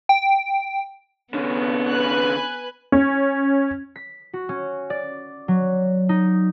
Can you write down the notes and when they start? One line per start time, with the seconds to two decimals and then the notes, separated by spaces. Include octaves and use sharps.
0.09 G5
1.34 D3 B3 C#4
1.89 B4 G#5 F#6
2.92 C#4
3.96 B6
4.33 F#4
4.49 C#4
4.90 D5
5.48 F#3
6.09 D#4